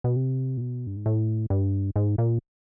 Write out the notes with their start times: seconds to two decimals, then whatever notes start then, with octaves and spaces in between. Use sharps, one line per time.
0.04 B2
0.16 C3
0.57 A#2
0.61 B2
0.87 G2
0.96 G#2
1.06 A2
1.50 G2
1.96 G#2
2.18 A#2